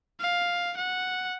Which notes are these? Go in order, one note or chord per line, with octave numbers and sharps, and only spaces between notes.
F5
F#5